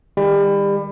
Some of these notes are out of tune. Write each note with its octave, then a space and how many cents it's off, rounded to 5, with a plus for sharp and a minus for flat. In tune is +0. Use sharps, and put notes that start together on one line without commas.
D#3 +0 G3 +30